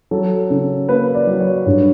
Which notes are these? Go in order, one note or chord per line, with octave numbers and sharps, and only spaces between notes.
F#3 A4
C#3
A#3 B4
D5
F#3
C#5
G2 C#5